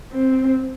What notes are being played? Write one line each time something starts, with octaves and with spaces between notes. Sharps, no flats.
C4